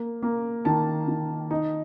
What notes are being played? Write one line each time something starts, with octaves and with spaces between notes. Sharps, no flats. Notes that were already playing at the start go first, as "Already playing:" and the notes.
Already playing: A#3
A#3
D#3 A5
D#3
D#4